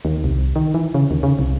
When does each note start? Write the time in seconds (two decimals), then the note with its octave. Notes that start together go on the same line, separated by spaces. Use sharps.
0.05 D#2
0.24 C2
0.56 D#3
0.74 E3
0.94 C#3
1.11 D#2
1.23 C#3
1.39 C2